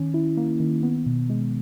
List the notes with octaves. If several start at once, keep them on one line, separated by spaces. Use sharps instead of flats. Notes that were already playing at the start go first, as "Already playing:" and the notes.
Already playing: D#3 C#4
E4
A#3
D#3
B3
B2
G#3